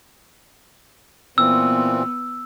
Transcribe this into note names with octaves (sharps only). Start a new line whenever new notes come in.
A#2 E3 B3 C4 E6